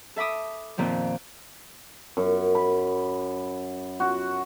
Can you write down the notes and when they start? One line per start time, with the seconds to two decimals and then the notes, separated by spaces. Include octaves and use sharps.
0.16 A4 E5 B5 D6 D#6
0.78 F2 A#2 D#3 F3
2.17 F#2
2.55 B5
4.00 F#4